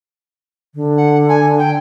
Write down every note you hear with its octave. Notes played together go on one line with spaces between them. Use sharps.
D3
F#5
G#5
G5